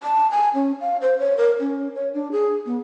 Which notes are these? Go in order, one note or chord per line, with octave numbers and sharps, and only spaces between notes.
A5
G#5
C#4
F5
C5
C#5
A#4
C#4
C#5
D4
G#4
B3